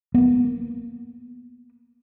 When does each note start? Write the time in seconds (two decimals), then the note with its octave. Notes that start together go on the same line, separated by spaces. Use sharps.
0.14 A#3 B3